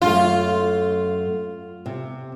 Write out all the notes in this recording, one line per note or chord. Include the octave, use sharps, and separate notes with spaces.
F#2 A3 F4
C3